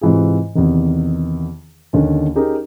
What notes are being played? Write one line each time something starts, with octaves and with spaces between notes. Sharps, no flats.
G#2 C3 E3 F4 G#4
E2 C3 D#3
D#2 D3 D#3 C#4
C#4 D#4 G4 G#4 A#4